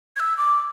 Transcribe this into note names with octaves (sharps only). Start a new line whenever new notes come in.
G#6
E6
D6